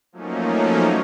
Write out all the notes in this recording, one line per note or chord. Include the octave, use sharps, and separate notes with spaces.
F3 F#3 A3 A#3 C#4 D#4